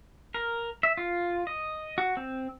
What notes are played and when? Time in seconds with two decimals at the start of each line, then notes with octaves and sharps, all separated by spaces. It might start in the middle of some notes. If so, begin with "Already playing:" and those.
0.34 A#4
0.83 E5
0.97 F4
1.47 D#5
1.98 F#4
2.17 C4